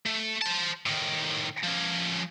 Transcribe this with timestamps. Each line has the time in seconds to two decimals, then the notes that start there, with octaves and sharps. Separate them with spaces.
0.06 A3
0.42 C5 A5
0.86 A2 D#3
1.64 F3 C#4